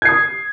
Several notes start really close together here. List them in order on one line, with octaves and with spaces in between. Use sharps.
G#6 C7 D#6